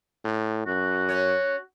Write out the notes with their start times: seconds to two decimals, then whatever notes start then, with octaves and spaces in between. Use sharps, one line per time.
0.25 A2
0.66 F#2 F#4
1.09 C#4 C#5